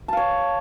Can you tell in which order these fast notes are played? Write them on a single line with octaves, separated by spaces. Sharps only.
A5 F5 C#5